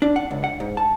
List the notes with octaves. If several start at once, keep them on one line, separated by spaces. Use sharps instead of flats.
D4
F#5
C#2
F#5
G#2
A5